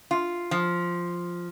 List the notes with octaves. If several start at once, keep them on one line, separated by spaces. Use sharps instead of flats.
F4
F3